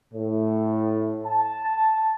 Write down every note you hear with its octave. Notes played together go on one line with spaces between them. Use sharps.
A2
A5